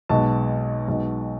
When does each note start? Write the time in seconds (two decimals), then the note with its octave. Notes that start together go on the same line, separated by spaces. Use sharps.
0.09 B1 B2 G#3 A5
0.87 B1 B2 G#3